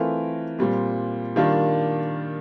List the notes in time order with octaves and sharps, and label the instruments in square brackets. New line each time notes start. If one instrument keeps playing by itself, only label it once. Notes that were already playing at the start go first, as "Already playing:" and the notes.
Already playing: [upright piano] E3 A3 C4 F4 A#4
A#2 G3 C4
D#3 G3 A#3 D4 F4